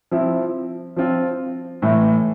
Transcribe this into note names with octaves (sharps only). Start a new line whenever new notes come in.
F3 C4 E4
F3 C4 F4
A2 E3 A3 E4